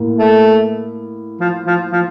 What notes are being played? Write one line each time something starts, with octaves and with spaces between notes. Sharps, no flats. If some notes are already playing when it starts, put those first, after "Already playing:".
Already playing: A2 A#3
A3
F3
F3
F3